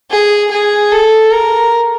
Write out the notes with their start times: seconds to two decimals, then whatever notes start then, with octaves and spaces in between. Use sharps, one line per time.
0.11 G#4
0.51 G#4
0.92 A4
1.33 A#4